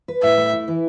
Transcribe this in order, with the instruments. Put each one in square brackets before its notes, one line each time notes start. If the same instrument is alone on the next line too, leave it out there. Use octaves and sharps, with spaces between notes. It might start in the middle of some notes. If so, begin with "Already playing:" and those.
[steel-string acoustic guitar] B4
[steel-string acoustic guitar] A2 [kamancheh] E5
[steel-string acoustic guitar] A3
E4
E3